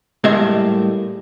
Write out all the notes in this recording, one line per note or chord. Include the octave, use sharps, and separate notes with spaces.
A2 G3 G#3 A#3 D#5 E5